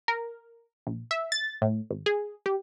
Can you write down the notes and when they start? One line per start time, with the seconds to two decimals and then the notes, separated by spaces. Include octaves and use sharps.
0.08 A#4
0.87 A#1
1.11 E5
1.32 A6
1.62 A2
1.91 G#1
2.06 G#4
2.46 G4